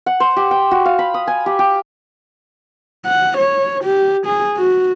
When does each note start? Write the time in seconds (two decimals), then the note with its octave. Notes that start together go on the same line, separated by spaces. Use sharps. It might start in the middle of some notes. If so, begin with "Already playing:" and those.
0.06 F#5
0.20 C5
0.36 G4
0.51 G5
0.71 F#4
0.85 F5
0.99 B5
1.14 D#6
1.27 G#5
1.46 G4
1.59 G4
3.06 F#5
3.38 C#5
3.84 G4
4.26 G#4
4.57 F#4